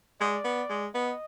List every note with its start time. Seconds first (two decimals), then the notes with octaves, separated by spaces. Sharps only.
0.20 G#3 D5
0.45 B3
0.69 G#3
0.94 B3 D#5